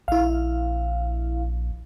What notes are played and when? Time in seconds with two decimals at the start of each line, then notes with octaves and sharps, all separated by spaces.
0.08 A#1 E4 F5